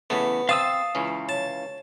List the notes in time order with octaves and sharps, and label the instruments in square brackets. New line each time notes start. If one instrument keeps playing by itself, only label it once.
[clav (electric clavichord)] E2 C#3 A3 [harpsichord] B3
[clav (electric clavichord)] C4 [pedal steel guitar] F5 D#6 E6 [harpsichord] A5
[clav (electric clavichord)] C#2 E3 C#4
[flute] C#5 [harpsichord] A5